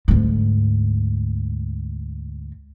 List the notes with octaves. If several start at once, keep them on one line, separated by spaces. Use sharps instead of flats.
D2 G#2